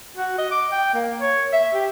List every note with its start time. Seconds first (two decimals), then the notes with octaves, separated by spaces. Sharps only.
0.17 F#4
0.38 D#5
0.51 D6
0.72 G5
0.94 A#3
1.21 C#5
1.53 E5
1.74 G4